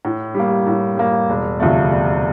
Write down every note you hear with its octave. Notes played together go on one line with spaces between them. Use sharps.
A2
G3 A#3
A2
G3 A#3
E1
D2 C3 F3 A3
E1